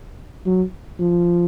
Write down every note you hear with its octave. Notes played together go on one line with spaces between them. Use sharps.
F#3
F3